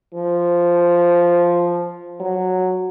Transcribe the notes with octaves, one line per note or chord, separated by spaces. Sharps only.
F3
F#3